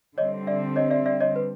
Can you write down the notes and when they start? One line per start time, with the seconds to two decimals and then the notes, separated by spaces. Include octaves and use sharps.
0.17 D3 G3 C4 C#5 D#5
0.47 D5 E5
0.76 C#5 D#5
0.90 D5 E5
1.06 D5 E5
1.21 C#5 D#5
1.36 B4